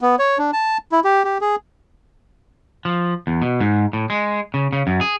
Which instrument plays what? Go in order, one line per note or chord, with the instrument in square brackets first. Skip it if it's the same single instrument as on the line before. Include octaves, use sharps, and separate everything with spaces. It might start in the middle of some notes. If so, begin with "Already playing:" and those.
[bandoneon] B3
C#5
D4
A5
E4
G4
G4
G#4
[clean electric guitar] F3
E2
B2
G#2
A2
G#3
C#3
C#3
F#2
G#4